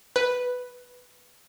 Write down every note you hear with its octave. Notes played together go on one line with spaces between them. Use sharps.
B4